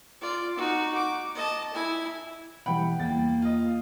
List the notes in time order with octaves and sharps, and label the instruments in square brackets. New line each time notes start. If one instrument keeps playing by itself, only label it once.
[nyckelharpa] F4 D5
D#4 F#4
D6
D#5 A5
E4 G#5
[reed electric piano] B2 E3 G3 [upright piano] F#5 G5 B5
[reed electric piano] E2 G5 [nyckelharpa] A#3 [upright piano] A6
[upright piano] F4 D#5